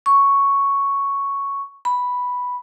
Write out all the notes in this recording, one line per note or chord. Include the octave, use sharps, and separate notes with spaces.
C#6
B5